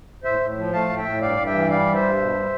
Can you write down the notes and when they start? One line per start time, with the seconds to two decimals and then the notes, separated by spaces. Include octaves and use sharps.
0.24 A2 C5 E5
0.40 A2
0.57 F3
0.72 A3 F5 A5
0.89 A2
0.97 E5 G5
1.05 A2
1.21 G2 D5 F5
1.37 G2
1.46 E5 G5
1.53 E3
1.70 G3 D5 F5
1.86 G2
1.94 C5 E5
2.02 G2
2.18 B2
2.34 G3